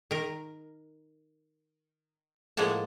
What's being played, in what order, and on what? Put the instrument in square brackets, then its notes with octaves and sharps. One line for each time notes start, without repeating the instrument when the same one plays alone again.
[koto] D#3 A#4
A2 F3 G#3 A#3 F#5 A5